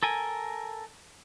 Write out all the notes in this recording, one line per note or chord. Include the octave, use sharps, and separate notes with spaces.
A4 A#4 G#5